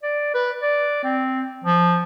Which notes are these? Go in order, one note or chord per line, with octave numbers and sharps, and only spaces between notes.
D5
B4
D5
C4
F3